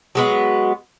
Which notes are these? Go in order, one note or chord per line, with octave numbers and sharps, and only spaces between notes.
F#3 G#3 B3